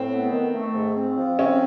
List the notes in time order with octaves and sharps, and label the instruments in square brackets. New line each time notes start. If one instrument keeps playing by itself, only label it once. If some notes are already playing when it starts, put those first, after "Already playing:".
Already playing: [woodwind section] A2 [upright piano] C4
[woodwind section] B3
D#3
A3
G#2
C4
F3
[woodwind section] C4 [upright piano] C#4